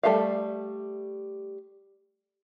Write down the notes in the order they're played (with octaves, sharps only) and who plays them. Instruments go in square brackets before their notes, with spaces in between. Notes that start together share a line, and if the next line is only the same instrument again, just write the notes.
[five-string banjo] G3 A3 A4 E5 F5